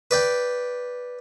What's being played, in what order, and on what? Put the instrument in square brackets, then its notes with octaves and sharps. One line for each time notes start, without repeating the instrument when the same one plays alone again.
[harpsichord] B4 D5 G5